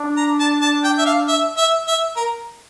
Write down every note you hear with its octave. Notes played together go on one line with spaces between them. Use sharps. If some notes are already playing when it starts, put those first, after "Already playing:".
Already playing: D4
A#5
A5
A5
G5
E5
F5
E5
E5
E5
A#4